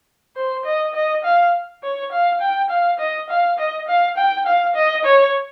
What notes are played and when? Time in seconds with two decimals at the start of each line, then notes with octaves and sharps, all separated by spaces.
0.36 C5
0.65 D#5
0.94 D#5
1.24 F5
1.83 C#5
2.12 F5
2.41 G5
2.70 F5
2.99 D#5
3.29 F5
3.58 D#5
3.88 F5
4.17 G5
4.46 F5
4.75 D#5
5.05 C#5